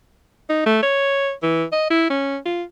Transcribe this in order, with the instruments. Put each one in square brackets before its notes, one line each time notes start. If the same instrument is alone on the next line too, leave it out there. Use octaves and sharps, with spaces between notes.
[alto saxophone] D#4
A3
C#5
E3
D#5
E4
C#4
F4